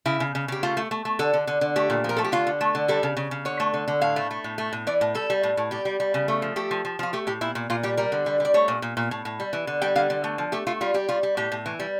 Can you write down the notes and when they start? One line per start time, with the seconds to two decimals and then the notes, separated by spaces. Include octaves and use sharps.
0.05 C#3 E4
0.20 C#3
0.35 C#3
0.48 C#3 G4
0.63 A3 F4
0.77 A3
0.91 A3
1.05 A3
1.19 D3 A4
1.33 D3
1.47 D3
1.61 D3
1.76 A3 G4
1.90 A#2
2.04 F3 A#4
2.17 A3 A4
2.24 G4
2.32 D3 F4
2.47 D3
2.61 A3
2.75 D3
2.88 G3 A4
3.03 C#3
3.17 C#3
3.31 C#3
3.45 D3 C#5
3.60 A3
3.74 D3
3.88 D3
4.01 A2 F5
4.16 A3
4.31 A3
4.44 A2
4.58 A3
4.73 A2
4.87 E3 D5
5.01 A2
5.15 G3 A4
5.30 G3
5.43 A2
5.57 A2
5.71 G3 G4
5.85 G3
6.00 G3
6.14 C#3
6.28 A3
6.42 F3
6.56 A3 G4
6.71 F3
6.85 F3
6.99 F3 F4
7.13 A3 G4
7.27 A2 G4
7.41 A#2 E4
7.55 A#2
7.70 A#2 F4
7.83 G3 G4
7.97 G3 A#4
8.12 D3
8.26 G3
8.40 G3 D5
8.54 A3 C#5
8.68 A#2
8.82 A#2
8.97 A#2
9.11 A2
9.25 A2
9.40 G3
9.53 E3
9.67 D3
9.82 G3 G5
9.96 D3 F5
10.10 D3
10.24 A3
10.38 F3
10.52 A3 G4
10.67 A3 F4
10.81 G3 F4
10.94 G3 G4
11.09 G3 F4
11.23 G3
11.37 A2 G4
11.52 A2
11.66 E3
11.79 G3